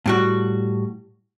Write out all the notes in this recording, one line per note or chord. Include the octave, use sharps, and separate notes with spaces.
A2 G3 F#4